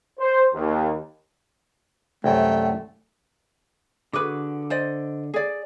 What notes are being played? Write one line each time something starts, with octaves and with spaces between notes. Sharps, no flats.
C5
D#2
C2 F#2 A3 G5
D3 F#4 G#4 B4 D6
C5 D5 D#5
G#4 D5